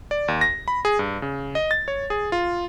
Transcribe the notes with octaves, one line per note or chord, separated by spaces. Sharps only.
D5
D#2
A#6
B5
G#4
G2
C#3
D#5
A6
C#5
G#4
F4